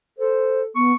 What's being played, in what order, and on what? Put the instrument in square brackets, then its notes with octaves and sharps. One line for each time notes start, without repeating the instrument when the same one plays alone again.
[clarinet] A4 [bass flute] C5
[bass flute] B3 [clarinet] C#6